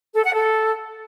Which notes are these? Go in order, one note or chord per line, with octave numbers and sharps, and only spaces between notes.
A4
F#5
A4